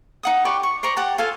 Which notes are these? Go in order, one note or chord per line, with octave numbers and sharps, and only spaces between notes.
D#4 F#5 D#6
G4 B4 D5 C#6
C#6
C5 D5 A#5 C#6
G4 F#5 A5
F4 A4 F5 G#5